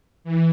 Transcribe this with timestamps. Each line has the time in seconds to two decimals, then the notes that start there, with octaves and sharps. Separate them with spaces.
0.24 E3